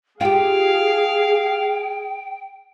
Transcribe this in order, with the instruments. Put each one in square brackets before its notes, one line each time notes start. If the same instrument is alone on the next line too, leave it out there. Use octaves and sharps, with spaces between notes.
[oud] F4 G4 [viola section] G#4 [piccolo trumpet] F5 [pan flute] G5